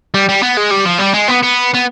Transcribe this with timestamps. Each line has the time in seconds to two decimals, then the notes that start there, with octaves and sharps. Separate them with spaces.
0.14 G3
0.29 G3
0.43 B3
0.57 G#3
0.71 G3
0.85 F3
0.99 G3
1.13 G#3
1.28 B3
1.43 B3
1.74 B3